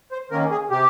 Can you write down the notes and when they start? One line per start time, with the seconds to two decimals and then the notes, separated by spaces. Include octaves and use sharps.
0.12 C5
0.31 D#3 A#3 C#4 A#4
0.51 G#4
0.70 C3 G4